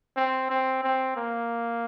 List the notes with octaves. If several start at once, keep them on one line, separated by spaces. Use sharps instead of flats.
C4
C4
C4
A#3